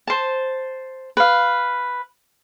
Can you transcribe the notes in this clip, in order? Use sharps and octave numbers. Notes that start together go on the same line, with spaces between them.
C5 A5
B4 F5